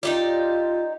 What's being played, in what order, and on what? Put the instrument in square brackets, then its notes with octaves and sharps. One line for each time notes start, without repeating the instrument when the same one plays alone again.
[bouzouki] D#4 G4 D5 [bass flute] F4